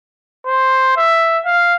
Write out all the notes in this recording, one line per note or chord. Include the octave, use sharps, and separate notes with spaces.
C5
E5
F5